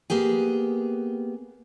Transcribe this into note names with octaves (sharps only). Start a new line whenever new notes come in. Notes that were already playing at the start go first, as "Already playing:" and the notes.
A#3 B3 G4 G#4